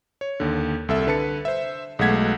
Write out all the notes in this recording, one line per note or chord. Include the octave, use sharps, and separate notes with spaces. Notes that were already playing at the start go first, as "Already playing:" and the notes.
C#5
D#2 D3
C2 A4 E5
D3 B4 A5 C#7
C5 E5
B1 G#3 A3 F#5 G#6 B6